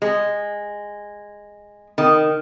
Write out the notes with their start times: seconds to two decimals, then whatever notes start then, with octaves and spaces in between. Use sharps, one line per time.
0.02 G#3
1.98 D#3